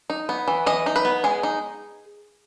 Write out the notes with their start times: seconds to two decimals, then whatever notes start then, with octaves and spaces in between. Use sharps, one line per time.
0.10 D#4
0.29 B3
0.48 E3
0.66 E3 D#5
0.86 D#4
0.96 B4
1.05 B3
1.24 G#3 G#4
1.43 D#4